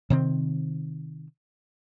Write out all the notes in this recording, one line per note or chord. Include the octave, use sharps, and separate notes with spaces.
C3 D#3 C4